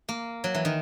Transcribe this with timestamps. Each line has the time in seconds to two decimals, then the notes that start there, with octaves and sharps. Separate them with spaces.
0.09 A#3
0.44 F#3
0.55 E3
0.65 D#3